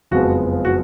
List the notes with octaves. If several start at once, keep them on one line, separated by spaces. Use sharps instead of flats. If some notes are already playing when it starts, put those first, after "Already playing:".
F#1 F2 F3 G#3 B3 F#4
F#4